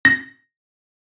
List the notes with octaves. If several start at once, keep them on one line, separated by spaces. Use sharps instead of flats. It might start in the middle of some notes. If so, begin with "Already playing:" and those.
A#6